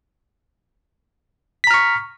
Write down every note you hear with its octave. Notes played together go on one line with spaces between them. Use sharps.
A#5 C#6 F6 B6